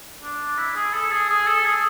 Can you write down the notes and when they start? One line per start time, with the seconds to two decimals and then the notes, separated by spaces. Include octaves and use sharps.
0.22 D4
0.58 E4
0.76 G#4
0.93 A4
1.11 G#4
1.28 G#4
1.47 A4
1.64 G#4